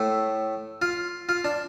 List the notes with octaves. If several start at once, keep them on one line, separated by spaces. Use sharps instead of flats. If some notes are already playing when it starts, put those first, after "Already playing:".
Already playing: A2 A3
F4
F4
D4